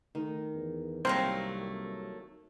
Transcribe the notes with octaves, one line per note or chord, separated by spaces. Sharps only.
D#3 A3
E2
C2 F#3 A3 A#3 C4